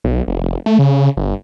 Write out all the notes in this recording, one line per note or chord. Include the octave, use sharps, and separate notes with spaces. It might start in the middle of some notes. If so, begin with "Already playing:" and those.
B1
F1
A3
C#3
G1